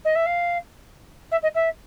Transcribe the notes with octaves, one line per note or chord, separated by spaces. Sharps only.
D#5
E5
F5
E5
D#5
E5